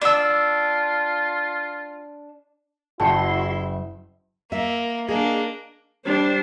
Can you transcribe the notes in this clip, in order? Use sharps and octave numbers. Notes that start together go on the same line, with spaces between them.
D4 F4 E6
F#1 E4 F#4 G5 A5 C6 C#7
A#3 E5
A#3 D4 G#4 D#5
G3 D4 C5